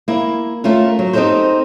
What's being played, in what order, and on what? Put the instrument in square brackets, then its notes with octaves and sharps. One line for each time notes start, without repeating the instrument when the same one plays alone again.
[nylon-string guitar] A#3 E4
A3 C#4 F4 A4 A#4
F#3
C4 D#4 G4 A4 A#4 C5